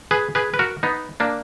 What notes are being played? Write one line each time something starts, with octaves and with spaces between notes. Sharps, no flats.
G#4 B4
G#4 B4
B4
F#4 A#4
B3 D#4
A#3 D4